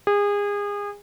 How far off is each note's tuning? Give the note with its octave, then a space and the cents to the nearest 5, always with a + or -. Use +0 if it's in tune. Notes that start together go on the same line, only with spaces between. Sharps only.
G#4 -30